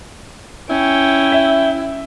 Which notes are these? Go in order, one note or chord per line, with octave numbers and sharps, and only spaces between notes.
C#4 E4 G5
E5